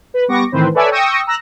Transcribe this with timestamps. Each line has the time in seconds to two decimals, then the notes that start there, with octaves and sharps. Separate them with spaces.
0.14 B4
0.28 G3 B3 C#6 D6 A#6
0.52 A2 D#3 E3 C4 B4 C5
0.74 A4 B4 C#5 D5 E5 G#5
0.91 G5 C#6 D#6 E6 A#6 C#7
1.27 A#5 E6 F#6 A#6